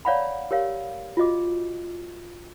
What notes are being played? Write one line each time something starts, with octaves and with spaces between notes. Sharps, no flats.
C#5 D5 F5 F#5 A#5 B5
G4 A#4 C#5 F5
F4 F#4 D#5 D6